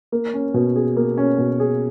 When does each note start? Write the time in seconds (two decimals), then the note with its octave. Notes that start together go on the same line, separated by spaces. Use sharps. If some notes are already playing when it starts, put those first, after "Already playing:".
0.12 A#3
0.34 C#4
0.54 B2
0.76 G#4
0.97 A#3
1.18 C#4
1.38 B2
1.60 G#4